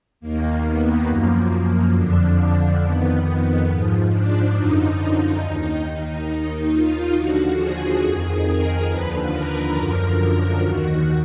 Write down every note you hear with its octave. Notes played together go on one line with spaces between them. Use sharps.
D#2 D#3 A#3
B3
F#2 F3 A#3
A#3
F2 D3 F3 D4
F2 D#3 B3
G#2 F3
D4
F#2 D3 F3 D#4
D#2 D#3 D#4
D#4
D#2 D#3
F4
D#2 D3 F3 F#4
G#4
F2 D#3 G#4
A#4
D#2 D3 F3 B4
A#4
F#2 D3 F3
D#2 D#3 F#4